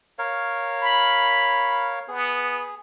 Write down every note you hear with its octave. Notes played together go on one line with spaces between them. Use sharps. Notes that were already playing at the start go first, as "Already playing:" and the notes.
A#4 C#5 F5
B5
B3 G#4